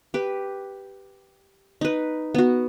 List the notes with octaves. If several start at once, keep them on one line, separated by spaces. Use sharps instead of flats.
G4 B4
D#4 B4
B3 F#4